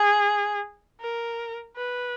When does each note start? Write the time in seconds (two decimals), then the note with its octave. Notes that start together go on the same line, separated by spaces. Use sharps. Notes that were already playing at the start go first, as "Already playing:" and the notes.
Already playing: G#4
1.01 A#4
1.77 B4